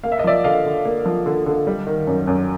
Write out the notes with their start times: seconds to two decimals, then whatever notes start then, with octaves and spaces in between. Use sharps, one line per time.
0.03 A#3 F5
0.12 E5
0.19 D#5
0.24 F3 D5 E5
0.44 D3 D#5 F5
0.65 D3
0.85 A#3
1.06 F3
1.26 D3
1.46 D3
1.67 G3
1.87 D#3
2.07 F#2
2.27 F#2